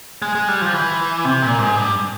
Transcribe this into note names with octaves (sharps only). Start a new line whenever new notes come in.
G#3
G#3
G3
F3
E3
C3
A#2
G#2
G2